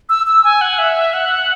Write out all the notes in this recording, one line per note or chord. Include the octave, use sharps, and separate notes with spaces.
E6
E6
G#5
F#5
E5
F#5